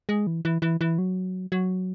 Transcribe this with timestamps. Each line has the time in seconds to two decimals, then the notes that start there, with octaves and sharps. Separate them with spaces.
0.09 G#3
0.27 E3
0.45 E3
0.62 E3
0.81 E3
0.98 F#3
1.52 F#3